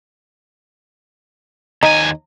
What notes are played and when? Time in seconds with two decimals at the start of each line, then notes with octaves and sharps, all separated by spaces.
1.83 D#2 D#4 G#5